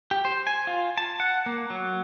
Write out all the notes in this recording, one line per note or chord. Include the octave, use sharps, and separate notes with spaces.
G4
C5
G#5
F4
A5
F#5
A#3
F#3